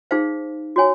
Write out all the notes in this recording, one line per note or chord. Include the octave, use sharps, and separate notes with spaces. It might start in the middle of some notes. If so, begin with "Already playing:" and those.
D#4 G#4 C5 F5
F#4 C#5 G#5